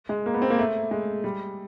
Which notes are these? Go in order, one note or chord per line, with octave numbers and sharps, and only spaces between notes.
G#3
A#3
B3
C4
A#3
A3
G#3
G3